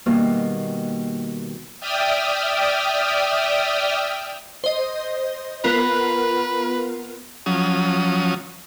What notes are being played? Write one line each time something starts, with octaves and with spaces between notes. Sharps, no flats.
B2 D#3 G3 A#3
D5 E5 G5 D#6 F6
C5 D#5
B3 F4 A#4 B4
F3 F#3 C#4 D#6